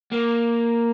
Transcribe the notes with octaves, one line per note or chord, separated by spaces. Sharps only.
A#3